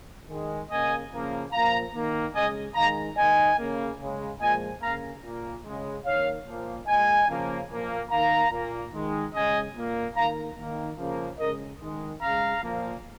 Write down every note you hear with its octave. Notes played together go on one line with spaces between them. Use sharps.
D#3 G#3
C#3 A#3 D#5 G#5
C#3 F3 A#3
A#2 F3 A#3 F5 A#5
D#3 A#3
C#3 G#3 D#5 G#5
D#3 G#3 F5 A#5
D#3 A#3 D#5 G#5
C#3 A#3
C#3 G#3
A#2 F3 G#3 D#5 G#5
C#3 A#3 F5 A#5
A#2 A#3
C#3 G#3
D#3 A#3 C#5 F5
A#2 F3 A#3
A#2 G#3 D#5 G#5
C#3 F3 A#3
A#2 F3 A#3
D#3 A#3 F5 A#5
A#2 A#3
D#3 G#3
C#3 G#3 D#5 G#5
A#2 A#3
D#3 A#3 F5 A#5
D#3 A#3
C#3 F3 A#3
C#3 G#3 A#4 D#5
D#3 G#3
C#3 G#3 F5 A#5
A#2 F3 A#3